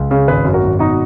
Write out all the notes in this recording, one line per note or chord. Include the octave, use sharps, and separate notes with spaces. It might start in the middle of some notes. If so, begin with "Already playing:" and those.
Already playing: C#2
C#3
G#1 G#4 B4
F#2
F#4 A#4
G#1
B2 D#4 F#4